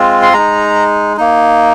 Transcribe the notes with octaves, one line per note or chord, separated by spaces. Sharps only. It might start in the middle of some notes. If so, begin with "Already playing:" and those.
Already playing: G#3 C4 F4
C6
G#3 D#4 A#5
A#3 D#4